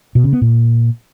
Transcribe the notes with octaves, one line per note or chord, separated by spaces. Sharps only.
B2
C#3
B3
A#2